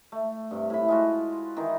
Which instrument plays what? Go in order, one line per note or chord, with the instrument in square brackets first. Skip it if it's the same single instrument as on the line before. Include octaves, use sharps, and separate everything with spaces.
[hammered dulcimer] A3
G2 C3
A2 B5
G#3 F4 F#4
D#3 E3 D#4